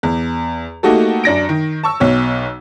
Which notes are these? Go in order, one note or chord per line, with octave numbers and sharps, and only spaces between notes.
E2
A3 A#3 D#4 F#4 G4 A4
F#2 D4 A#6 D7
D#3
A5 C#6 E6
B1 B2 C#5